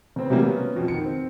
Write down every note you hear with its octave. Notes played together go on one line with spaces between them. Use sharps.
C#3 B3 C4 C5
C3 E3 F#3 G3 A3 A#3
B3 C#4
F2 B2 F3
D#3 C#7
C4